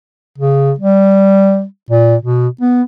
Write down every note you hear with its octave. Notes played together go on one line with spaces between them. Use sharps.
C#3
G3
A#2
B2
B3